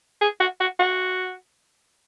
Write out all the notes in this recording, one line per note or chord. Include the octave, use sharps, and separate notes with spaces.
G#4
F#4
F#4
F#4